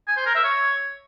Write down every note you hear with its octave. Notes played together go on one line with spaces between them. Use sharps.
G#5
C5
A#4
E5
C#5